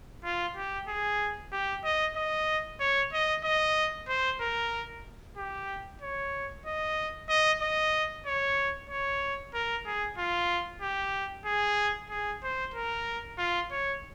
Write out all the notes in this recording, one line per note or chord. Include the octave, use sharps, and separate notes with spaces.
F4
G4
G#4
G4
D#5
D#5
C#5
D#5
D#5
C5
A#4
G4
C#5
D#5
D#5
D#5
C#5
C#5
A#4
G#4
F4
G4
G#4
G#4
C5
A#4
F4
C#5